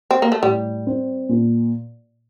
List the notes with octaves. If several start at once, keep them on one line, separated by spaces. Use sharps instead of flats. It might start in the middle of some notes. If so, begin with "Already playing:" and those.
C4
A#3
A3
A2 G3
C4
A#2